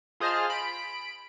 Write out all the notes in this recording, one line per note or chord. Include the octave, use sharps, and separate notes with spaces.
F4 G#4 C5 D#5 A5 F6
B5 D7